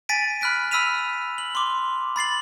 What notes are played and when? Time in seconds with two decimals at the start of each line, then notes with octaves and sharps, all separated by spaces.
0.09 G#5 A6 B6 D7 D#7
0.41 B5 F6 F#6 B6 D7
0.71 B5 E6 F6 B6 D#7 F7
1.38 F#7
1.55 C6 D6
2.16 B5 A6 C7 F#7